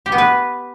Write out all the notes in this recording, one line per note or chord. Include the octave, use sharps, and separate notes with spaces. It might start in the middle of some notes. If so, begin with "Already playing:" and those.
G4
B3
B4